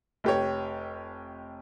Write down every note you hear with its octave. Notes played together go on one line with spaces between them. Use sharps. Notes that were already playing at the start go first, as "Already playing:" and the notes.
F1 G4 C#5